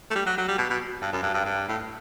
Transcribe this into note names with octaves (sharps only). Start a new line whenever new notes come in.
A3
G3
F#3
F#3
G3
B2
B2
G2
F#2
G2
G2
G2
A2